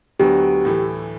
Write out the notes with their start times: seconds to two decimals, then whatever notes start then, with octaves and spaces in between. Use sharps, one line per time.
0.19 D2 D3 F#3 B3 G4
0.65 A2 E3 A3